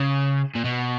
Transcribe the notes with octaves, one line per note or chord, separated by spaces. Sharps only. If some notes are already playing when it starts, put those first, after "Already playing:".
Already playing: C#3
A#2
B2